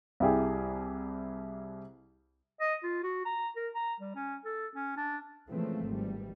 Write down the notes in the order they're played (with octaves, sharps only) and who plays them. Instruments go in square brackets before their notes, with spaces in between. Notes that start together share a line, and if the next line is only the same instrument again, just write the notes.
[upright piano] C2 E4 G4 G#4
[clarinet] D#5
F4
F#4
A#5
A#4
A#5
G3
C#4
A4
C#4
D4
[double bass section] C#3 E3 F3 G#3 A3 C4
G#1 E3 G3